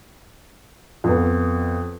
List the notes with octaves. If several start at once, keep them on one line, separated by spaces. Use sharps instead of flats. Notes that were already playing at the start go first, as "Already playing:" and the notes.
F2 B3